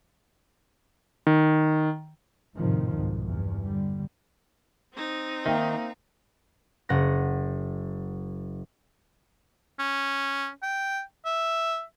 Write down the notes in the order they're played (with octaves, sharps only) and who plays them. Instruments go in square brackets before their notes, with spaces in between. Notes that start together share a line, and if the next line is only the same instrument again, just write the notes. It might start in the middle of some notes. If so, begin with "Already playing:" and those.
[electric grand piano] D#3
[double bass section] G#1 F2 A2 C3 D#3 F3
C2 G#2 B2
E2 G2
D3 G3
[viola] C4 D#4
[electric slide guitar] D#3 [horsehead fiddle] A#3 [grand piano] E5 G5
[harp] F#1 F#5 A#6
[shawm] C#4
G5
E5